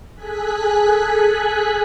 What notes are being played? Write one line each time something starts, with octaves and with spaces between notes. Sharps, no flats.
G#4 A4 G#5 F#6 B6